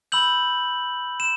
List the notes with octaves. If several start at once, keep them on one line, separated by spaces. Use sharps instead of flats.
B5 E6 G6 F#7
E7